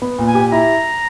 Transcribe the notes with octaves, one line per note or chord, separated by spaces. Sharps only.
B3
A#2
G#5
G4
E4 A#5